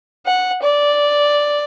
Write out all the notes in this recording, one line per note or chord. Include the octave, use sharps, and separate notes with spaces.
F#5
D5